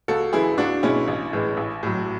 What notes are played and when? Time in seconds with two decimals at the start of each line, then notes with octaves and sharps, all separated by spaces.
0.08 C#2 F#4 A4
0.33 C#3 E3 G#3 E4 G#4
0.58 C#2 D4 F#4
0.83 B2 G#3 C#4 E4
1.08 A1
1.33 A2 E3 G#3
1.57 A1
1.83 A2 F#3